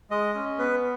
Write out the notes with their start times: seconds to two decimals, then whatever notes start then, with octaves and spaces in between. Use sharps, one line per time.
0.10 G#3 D#5
0.35 C#4
0.58 B3 B4